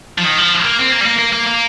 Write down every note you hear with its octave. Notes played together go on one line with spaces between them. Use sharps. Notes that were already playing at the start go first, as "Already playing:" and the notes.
F3
D#3
F3
A#3
C4
A#3
G3
A#3
A#3
A#3
A#3